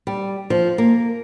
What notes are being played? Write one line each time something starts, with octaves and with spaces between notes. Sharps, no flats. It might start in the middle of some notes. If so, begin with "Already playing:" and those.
G3
F3
A#3